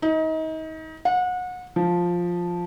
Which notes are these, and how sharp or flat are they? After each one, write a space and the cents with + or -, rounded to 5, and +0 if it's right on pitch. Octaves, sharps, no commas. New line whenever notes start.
D#4 +30
F#5 -30
F3 +5